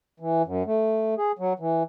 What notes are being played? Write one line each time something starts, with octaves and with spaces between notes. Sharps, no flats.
E3
F#2
A3
G#4
F#3
E3